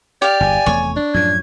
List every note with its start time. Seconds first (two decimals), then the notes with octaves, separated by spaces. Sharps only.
0.22 G4 D5 F5
0.40 G1 E2 G#5
0.66 F1 E2 A3 C#5
0.96 D4
1.14 F#2 A2 F3 G#6